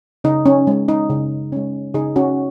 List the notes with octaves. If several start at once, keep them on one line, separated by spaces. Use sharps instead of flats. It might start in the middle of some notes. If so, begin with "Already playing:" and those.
C#3 D#4
C#4
G#3 C#4
D#4
C#3
G#3 C#4
C#3 D#4 G#4
C#4 F#4